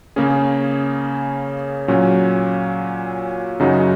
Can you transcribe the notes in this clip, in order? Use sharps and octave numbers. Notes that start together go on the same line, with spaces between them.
C#3 A#3 C#4 G#4
A#2 F#3 C#4
F#2 C#3 F#3 D#4 F#4